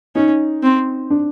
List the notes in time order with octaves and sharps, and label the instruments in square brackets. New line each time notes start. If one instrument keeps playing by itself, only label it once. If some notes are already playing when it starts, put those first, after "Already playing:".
[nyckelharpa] C#4 [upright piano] D#4
[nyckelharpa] C4
[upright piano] D4